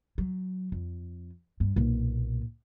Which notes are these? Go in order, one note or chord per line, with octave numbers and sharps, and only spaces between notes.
F#3
F2
G2
B1 A#2